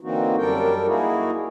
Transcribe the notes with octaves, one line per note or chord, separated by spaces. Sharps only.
D3 E3 A#3 C4 D#4 F#4
F#2 G3 D4 A4 A#4 G5
A#3 D#4 E4 F#4 G#4